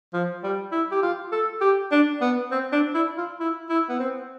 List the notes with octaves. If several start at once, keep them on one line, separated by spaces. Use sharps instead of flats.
F3
G3
E4
G4
F4
A4
G4
D4
B3
C4
D4
E4
F4
E4
E4
B3
C4